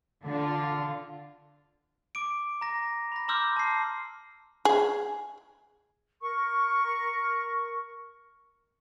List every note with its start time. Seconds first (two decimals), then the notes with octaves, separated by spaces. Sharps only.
0.25 D3 F4
2.15 D6 D7
2.61 A#5 A#6
3.12 B5 A#6
3.28 A#5 C6 D6 E6 F6 G6
3.57 A5 C7
4.65 G#4
6.21 A#4 C#6